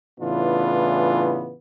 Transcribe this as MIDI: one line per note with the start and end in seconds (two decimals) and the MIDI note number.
0.20 1.54 45
0.20 1.54 49
0.20 1.54 52
0.20 1.54 59
0.20 1.54 62
0.20 1.54 65